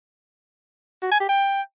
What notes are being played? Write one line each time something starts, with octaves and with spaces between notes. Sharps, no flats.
F#4
G#5
G4
G5